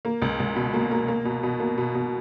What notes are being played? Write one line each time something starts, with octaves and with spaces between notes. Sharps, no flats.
A#3
C#2
C#2
B2
A#3
A#3
A#3
B2
B2
A#3
B2
B2